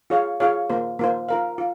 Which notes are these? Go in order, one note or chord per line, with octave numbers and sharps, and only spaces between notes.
F4 G#4 C#5 F5
F4 G#4 C#5 F5
A#3 F4 C5
A#3 F4 C5
F4 A#4 F5
F4